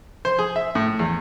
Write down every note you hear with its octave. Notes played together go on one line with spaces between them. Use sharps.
C5
G#4
E5
A2
E2